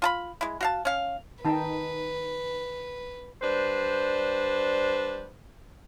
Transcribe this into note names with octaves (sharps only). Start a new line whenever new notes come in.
F4 A5 B5
G#3 E4
F#4 F5 A5
C#4 F5
D#3 D#4 B4 G5 A5
G3 D4 B4 C5